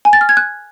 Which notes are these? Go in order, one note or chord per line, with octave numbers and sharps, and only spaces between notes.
G#5
A6
F6
G#6
F#6